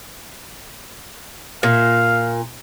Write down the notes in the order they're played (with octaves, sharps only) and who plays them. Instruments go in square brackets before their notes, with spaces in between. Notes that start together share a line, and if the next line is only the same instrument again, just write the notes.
[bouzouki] A#2 [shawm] F5